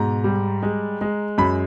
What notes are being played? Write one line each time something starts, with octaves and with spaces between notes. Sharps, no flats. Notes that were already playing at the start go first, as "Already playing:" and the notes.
Already playing: G#2 B2 A#5
G3
G#3
G#3
F#2 B5